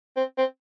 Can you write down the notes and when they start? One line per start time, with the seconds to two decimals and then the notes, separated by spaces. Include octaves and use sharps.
0.17 C4
0.38 C4